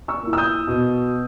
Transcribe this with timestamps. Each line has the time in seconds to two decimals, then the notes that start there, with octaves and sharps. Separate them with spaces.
0.08 C#6 E6
0.23 A#3 E4
0.33 E6
0.37 D#6 G6
0.67 B2